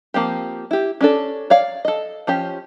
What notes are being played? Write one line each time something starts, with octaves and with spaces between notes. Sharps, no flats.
F3 A#3 C4 G4
E4 G4
C#4 D4 A4
C#5 D5 F5
A4 D#5
F3 C#4 G4